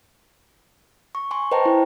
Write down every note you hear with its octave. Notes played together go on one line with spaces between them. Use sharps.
C#6
G#5 C6 C#6
B4 C5 D#5 G5 A5 A#5
E4